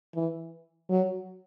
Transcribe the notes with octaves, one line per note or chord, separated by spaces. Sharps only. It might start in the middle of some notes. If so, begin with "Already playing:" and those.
E3
F#3